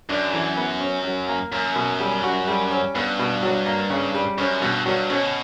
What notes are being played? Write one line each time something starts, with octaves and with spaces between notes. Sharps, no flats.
F#2 D4
E3
B3
C#4
F#3
A#3
F#2 A#3
B2
G3
F#4
G3
C#4
G2 B3
B2
F#3
A#3
C#3
G3
F#2 C#4
G2 B2
G2 F#3
B2 C#4